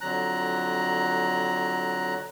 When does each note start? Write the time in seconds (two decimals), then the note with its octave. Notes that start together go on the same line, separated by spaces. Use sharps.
0.01 F2 D3 F#3 A#5 F#6